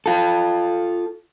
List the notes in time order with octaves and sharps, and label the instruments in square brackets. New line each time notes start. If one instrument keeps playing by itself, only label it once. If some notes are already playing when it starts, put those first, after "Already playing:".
[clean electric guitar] F4 A4